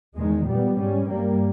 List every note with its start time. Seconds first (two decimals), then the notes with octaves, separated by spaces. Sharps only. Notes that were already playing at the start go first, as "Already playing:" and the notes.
0.16 E2 D#3 G#3
0.46 A#2 G3 B3
0.77 G#2 G3 C#4
1.07 G2 G3 A#3